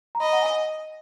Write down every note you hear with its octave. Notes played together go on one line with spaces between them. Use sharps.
A#5
D#5 B5
F#5
G#5